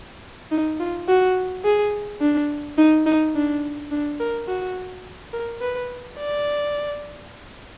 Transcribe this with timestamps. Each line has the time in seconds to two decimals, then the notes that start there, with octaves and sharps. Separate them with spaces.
0.51 D#4
0.80 F4
1.08 F#4
1.65 G#4
2.21 D4
2.78 D#4
3.06 D#4
3.35 D4
3.91 D4
4.20 A#4
4.48 F#4
5.33 A#4
5.61 B4
6.19 D5